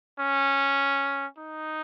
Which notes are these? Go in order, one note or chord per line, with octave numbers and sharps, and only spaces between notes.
C#4
D#4